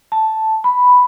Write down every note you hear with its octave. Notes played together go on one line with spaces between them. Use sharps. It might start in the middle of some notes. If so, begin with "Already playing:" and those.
A5
B5